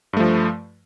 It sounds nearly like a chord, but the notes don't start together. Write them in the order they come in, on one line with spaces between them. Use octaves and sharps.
G2 A3 F3